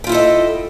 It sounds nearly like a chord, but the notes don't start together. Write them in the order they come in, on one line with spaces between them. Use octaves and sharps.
G5 F4 E4 A4 D#5